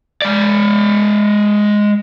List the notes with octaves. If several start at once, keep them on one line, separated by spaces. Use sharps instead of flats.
G#3 D5